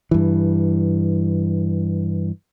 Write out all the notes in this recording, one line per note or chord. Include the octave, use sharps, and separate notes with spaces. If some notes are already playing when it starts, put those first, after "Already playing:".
G2 E3